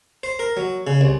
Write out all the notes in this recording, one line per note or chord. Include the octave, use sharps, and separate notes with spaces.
C5
A#4
F#3
C#3
C2